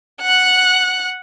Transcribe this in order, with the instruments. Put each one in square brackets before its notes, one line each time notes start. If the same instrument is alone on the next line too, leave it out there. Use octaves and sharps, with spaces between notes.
[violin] F#5 F#6